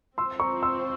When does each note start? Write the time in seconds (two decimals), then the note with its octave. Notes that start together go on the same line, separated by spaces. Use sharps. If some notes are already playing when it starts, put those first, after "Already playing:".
0.18 C4 F4 C5 C6 E6
0.40 A#5 C#6
0.63 C6 E6